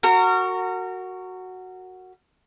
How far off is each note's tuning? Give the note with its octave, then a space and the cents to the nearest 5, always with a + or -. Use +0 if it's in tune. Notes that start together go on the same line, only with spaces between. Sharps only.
F#4 +0 A#4 -30